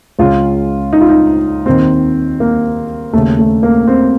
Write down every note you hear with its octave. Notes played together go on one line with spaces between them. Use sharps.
C#2 C#3 F4
D#4
F4
D#4
D#2 D#3 C4
A#3
D#2 C#3 A3
A3
A#3
C4